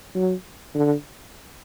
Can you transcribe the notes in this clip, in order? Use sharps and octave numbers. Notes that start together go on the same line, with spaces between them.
F#3
D3